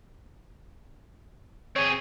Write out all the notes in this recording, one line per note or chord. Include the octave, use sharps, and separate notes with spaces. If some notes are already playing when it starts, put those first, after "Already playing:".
C4 G#4 C#5